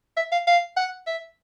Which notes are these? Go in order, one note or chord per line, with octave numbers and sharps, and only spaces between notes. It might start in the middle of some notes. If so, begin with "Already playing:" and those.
E5
F5
F5
F#5
E5